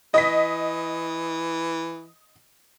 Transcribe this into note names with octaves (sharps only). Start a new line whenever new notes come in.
E3 D#5 B6